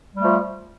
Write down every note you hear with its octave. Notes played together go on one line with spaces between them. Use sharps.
F3 G3 A3